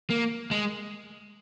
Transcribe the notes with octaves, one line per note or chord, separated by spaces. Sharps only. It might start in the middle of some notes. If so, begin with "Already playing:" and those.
A#3
G#3